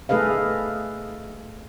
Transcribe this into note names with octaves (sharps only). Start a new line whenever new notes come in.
A3 G#4 A4 B4 D#5 F5